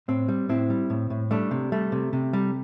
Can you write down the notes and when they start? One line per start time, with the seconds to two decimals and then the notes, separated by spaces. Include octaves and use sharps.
0.08 A2 C4
0.28 G3
0.49 A2 C4 E4
0.70 G3
0.90 A2
1.10 A2
1.31 G3 A3 D4
1.51 C3
1.72 G3 A3
1.92 C3
2.13 C3
2.33 G3